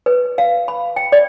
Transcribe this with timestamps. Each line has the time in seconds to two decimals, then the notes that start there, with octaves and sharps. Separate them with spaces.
0.06 B4
0.38 F5
0.68 B5
0.96 G5
1.12 D5